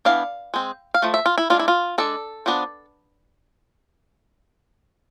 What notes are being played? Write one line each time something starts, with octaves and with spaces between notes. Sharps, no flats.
E3 B3 D4 F5
G#3 C4
F5
F3 A3
E5
F4
E4
G#3 D4 F4
E4
F4
G#3 D4 A4
F3 B3 D4